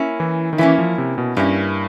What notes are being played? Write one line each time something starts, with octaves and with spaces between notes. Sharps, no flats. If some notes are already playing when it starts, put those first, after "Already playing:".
Already playing: A#3 C#4 E4
E3
D#3
E3 A#3 C#4 E4
F3
C3
B2
G2 A#3 C#4 E4